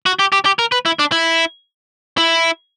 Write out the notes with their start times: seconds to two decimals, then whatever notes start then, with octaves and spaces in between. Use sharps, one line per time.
0.06 F#4
0.19 G4
0.32 G4
0.46 G4
0.59 A#4
0.72 B4
0.86 E4
0.99 D4
1.12 E4
2.18 E4